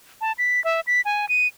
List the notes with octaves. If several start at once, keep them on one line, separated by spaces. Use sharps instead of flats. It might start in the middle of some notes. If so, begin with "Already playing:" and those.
A5
B6
E5
B6
G#5
D#7